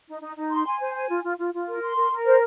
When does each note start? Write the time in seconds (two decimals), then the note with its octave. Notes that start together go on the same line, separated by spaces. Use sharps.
0.08 D#4
0.22 D#4
0.36 D#4
0.51 C6
0.66 G#5
0.80 C5
0.95 G#5
1.09 F4
1.24 F4
1.38 F4
1.53 F4
1.68 A#4
1.82 C6
1.97 A#4
2.11 A#4
2.25 C5